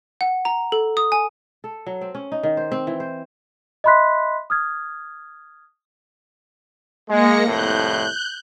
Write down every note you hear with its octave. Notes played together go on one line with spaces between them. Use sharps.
F#5
A#5
A4
D#6
G#5
A4
F#3
C4
C#4
D#4
D#3
C5
C4
E3
C5
D#5 E5 B5 C6 F#6 B6
D#6 F6 G#6
G#3 A#3 A#6 C#7
C2 F2 A2 F#6 G6